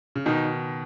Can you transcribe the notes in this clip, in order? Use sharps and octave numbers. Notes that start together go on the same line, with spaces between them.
C#3
B2 D#3 D#4